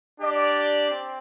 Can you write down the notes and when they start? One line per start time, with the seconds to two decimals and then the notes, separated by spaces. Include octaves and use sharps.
0.20 D4 G4 D5
0.90 C4